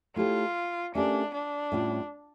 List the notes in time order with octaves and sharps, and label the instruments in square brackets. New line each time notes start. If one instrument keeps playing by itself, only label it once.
[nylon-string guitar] A3 E4 G4 C#5 [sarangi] F4
[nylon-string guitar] A3 C#4 G4 A#4 D5 [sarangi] D4
[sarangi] D4
[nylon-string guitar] A2 G3 C#4 F4